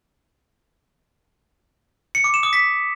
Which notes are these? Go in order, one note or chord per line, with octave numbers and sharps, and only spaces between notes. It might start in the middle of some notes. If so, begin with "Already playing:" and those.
C#7
D6
E7
D#6
B6